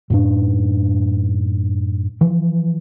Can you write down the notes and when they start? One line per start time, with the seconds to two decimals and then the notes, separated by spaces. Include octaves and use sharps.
0.10 F#2 A2 D4
2.21 E3 F3